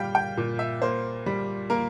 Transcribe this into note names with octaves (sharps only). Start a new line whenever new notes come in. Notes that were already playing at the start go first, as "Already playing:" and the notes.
Already playing: A#2 G3 F5 G5
G5
A#2
E5
A#3 C5
G3
A#3 A#4